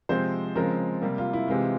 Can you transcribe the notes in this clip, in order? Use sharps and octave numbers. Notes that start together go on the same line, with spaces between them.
C3 F3 G#3 C4 C5
C#3 F3 G#3 C4 A#4
C3 G3 A#3
F4
E4
C3 E3 G#3 C4 F4